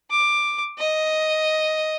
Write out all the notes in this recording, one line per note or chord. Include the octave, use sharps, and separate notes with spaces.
D6
D#5